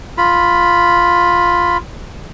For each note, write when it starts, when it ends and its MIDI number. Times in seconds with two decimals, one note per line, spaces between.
0.18 1.77 65
0.18 1.77 83